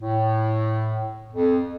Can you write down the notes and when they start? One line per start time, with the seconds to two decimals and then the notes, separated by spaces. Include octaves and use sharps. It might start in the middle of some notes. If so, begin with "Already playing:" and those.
0.02 A2
1.33 F2